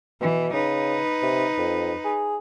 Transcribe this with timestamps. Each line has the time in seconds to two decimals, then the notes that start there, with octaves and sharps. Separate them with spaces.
0.21 B2 E3
0.53 C#3 D#4 B4
1.22 C3
1.58 F2
2.05 G#4